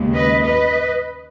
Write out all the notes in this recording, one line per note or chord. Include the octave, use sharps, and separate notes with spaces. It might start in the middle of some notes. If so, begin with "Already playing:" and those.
Already playing: D#2 C#3 G#3
B4 D#5
B4 D#5